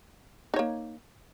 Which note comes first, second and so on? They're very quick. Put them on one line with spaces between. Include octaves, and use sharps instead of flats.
D#4 C#5 A#3